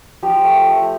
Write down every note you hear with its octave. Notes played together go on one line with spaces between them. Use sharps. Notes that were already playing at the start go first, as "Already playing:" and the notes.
F3 G4
A3
A3